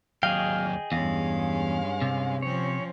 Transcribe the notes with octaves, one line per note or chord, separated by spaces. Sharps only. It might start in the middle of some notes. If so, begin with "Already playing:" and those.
D#2 F#3 G#4 D#5 F5 G5
E2 G2 G#3 C#4 F5
C3
F3 C4 C#4 C#5